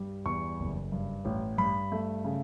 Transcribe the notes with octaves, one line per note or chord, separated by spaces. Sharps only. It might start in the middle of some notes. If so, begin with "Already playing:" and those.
Already playing: G2 G3
E2 C#6
F#1
G2
A1
G2 B5
A3
C#3